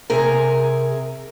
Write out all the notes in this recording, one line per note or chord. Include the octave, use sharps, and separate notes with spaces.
C3 G#4 A#4